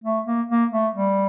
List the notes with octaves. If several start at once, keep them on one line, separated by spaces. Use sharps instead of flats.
A3
A#3
A#3
A3
G3